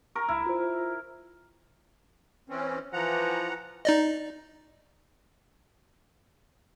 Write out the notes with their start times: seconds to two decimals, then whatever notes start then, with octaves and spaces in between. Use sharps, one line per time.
0.15 A#4 C#6
0.28 C#2 E4 F6
0.46 F4 C5
2.49 E3 C4 C#4
2.93 E3 F3 F#5 A#5
3.85 D#4 D5 D#5